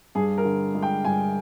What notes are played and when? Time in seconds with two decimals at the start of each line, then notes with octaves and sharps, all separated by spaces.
0.15 G2 G#4
0.38 A#4
0.45 D3
0.75 G#3
0.82 G5
1.04 G2 G#5